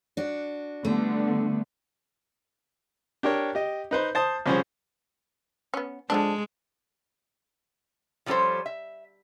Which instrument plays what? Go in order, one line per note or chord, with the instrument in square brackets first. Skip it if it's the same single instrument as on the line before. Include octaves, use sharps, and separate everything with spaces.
[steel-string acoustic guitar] D4 F#4
[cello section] D3 G3 B3 [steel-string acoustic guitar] A3
[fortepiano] D4 G4 A#4 C#5
G4 D#5
D#4 B4 C5
C5 A5 D#6
C2 F3 C#4 G#4 C5
[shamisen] B3 C#4
[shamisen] D3 F3 D4 [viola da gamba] G#3
[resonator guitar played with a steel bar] F3 G3 C#4 F4 A4 C5
E5